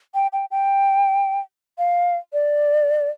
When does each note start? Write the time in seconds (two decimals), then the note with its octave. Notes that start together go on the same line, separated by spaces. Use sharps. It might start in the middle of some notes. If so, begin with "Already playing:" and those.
0.15 G5
0.33 G5
0.51 G5
1.78 F5
2.33 D5